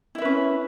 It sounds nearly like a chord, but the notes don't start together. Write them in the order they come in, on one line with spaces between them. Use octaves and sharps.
E4 E5 B4 C#4